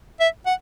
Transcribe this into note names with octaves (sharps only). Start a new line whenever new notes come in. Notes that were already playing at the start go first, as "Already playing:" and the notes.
E5
F#5